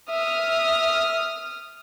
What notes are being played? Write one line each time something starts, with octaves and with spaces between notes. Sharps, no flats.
E5 D#6 F6